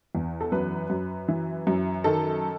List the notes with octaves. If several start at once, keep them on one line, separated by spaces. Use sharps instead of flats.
E2
A4
F#2 B4
F#2
E3
F#2
D#3 A4